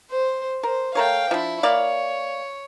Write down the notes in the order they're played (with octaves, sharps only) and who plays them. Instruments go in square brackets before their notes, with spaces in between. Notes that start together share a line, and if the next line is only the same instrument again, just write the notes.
[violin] C5
[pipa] A#4 [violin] C5
[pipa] A3 A#4 C#5 [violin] F5 G5
[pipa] F3 D4 [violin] E4
[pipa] A#3 D5 F5 [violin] C#5